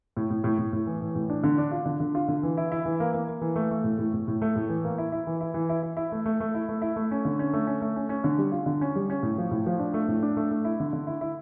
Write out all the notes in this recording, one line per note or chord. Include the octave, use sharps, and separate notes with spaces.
A2
A2
A2
A2
A2
E3
E3
A2
D4
D3
D4
F4
D3
D3
F4
D3
E3
E4
E4
E3
A#3
A#3
A#3
E3
A3
A3
A2
A2
A2
A2
A3
A2
E3
A#3
E4
E4
E3
E4
E3
E4
E4
E4
A3
A3
A3
E4
A3
E4
A3
C#4
D3
C#4
A3
C#4
A3
C#4
C#4
D3
G3
F4
D3
C#4
G3
C#4
A2
F3
A2
F3
D4
A3
A2
D4
A3
A3
E4
D3
D3
E4
E4